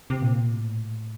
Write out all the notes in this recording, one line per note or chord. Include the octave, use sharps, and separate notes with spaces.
C3
A#2
A2